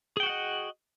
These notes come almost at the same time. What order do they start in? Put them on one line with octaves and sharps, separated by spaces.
G#4 G5 F#4 F#5 D#5